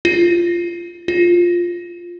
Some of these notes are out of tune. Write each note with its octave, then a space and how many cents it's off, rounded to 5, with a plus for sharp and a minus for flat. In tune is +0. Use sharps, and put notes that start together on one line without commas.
F4 -15
F4 +5